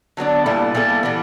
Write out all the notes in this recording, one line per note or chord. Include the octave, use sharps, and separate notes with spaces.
D3 F#3 B3 D4
A#2 G3 B3 E4 A4
A#2 G3 B3 E4 A4
E3 G3 B3